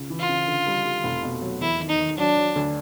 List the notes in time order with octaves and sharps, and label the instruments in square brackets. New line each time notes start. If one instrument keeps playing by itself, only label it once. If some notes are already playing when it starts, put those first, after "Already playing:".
Already playing: [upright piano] C#2
E3
[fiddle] F4
[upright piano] C#3
D3
G3
G3
F1
B2
F#3
[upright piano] E2 [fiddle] E4
[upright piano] D#3
[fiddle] D#4
[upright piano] D#3
[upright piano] F#3 [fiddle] D4
[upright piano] F#3
D2